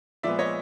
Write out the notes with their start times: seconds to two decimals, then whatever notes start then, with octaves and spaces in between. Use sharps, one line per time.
0.23 A#2 F3 G#3 B3 D5 E5
0.39 C#5 D#5